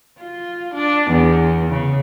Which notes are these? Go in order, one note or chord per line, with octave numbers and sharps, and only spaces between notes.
F4
D4
E2
C#3